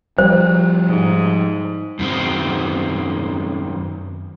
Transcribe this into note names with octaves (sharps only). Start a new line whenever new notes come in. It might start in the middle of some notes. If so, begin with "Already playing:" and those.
F3 G3 C5
G#2
F#2 D#3 C4